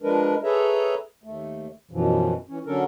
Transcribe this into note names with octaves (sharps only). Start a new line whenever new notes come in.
F3 G#3 D4 A#4 B4
G#4 A4 B4 C#5 E5 A#5
D#2 A3
F#2 B2 E3 F3
E3 C#4
D3 F#3 C#4 D4 A4 A#4